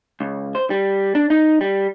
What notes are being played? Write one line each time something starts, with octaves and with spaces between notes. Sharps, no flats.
C#2
C5
G3
D4
D#4
G3